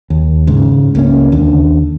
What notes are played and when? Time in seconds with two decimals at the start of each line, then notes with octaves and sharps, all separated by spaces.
0.10 D#2
0.47 G#2 C#3
0.95 C#2 A#3 C#4
1.32 D#2 D3